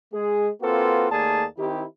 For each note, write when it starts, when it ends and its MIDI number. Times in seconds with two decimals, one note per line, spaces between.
0.13 0.49 56
0.13 0.49 68
0.62 1.09 58
0.62 1.09 60
0.62 1.09 65
0.62 1.09 66
0.62 1.09 69
0.62 1.09 71
1.11 1.45 39
1.11 1.45 57
1.11 1.45 58
1.11 1.45 68
1.11 1.45 74
1.11 1.45 81
1.58 1.84 51
1.58 1.84 60
1.58 1.84 63
1.58 1.84 64
1.58 1.84 67